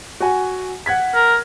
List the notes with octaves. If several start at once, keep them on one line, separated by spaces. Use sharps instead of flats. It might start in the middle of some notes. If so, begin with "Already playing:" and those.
F#4 F#5 G#5
F#5 G#6 B6
A#4